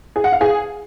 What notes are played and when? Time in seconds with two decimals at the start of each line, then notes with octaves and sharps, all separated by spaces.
0.16 G#4
0.24 F#5
0.32 F5
0.41 G#4